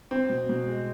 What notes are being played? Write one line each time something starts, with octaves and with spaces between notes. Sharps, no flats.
C4
B2
B2
G#3